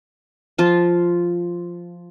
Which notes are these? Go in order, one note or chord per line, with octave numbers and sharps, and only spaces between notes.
F3 F4